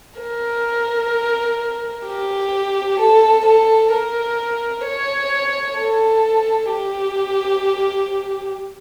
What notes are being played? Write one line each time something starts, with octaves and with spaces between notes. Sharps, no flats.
A#4
G4
A4
A4
A#4
C#5
A4
G4